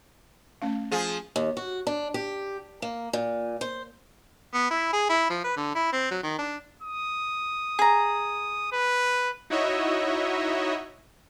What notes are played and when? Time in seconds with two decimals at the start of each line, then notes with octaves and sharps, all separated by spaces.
0.62 A3 C#4 F5
0.92 F3 G#4
1.36 D#2
1.57 F#4
1.87 D4
2.14 G4
2.82 A#3
3.13 A#2
3.61 C5
4.54 B3
4.71 E4
4.93 G#4
5.09 E4
5.30 F3
5.44 B4
5.56 D3
5.75 E4
5.93 C4
6.11 F#3
6.23 D#3
6.38 D4
6.82 D#6
7.79 G#4 A#5
8.72 B4
9.50 D#4 E4 F#4 C#5 D#5 E5